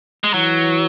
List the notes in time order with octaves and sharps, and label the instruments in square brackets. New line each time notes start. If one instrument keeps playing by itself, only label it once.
[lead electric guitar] G#3
[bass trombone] E3 [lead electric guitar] F#3